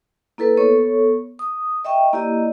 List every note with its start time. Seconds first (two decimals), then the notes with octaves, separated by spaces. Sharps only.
0.38 A#3 E4 A4 B4
0.57 B3 A4 C#5 C#6
1.39 D#6
1.85 D#5 E5 G5 C#6
2.13 A#3 E4 G4 D5 D#5